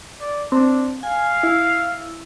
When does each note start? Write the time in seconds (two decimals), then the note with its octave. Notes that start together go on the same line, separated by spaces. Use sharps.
0.21 D5
0.52 C4 D4
1.03 F5 G#5
1.43 E4